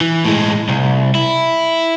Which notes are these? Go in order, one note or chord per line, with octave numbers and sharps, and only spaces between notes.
E3
A2 G#3
C2
E4